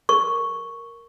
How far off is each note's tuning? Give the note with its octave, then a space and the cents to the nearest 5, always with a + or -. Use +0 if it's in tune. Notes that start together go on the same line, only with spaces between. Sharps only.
A#4 +0 C#6 +0